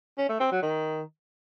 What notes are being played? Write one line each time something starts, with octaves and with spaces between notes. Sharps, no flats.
C#4
A3
C4
F#3
D#3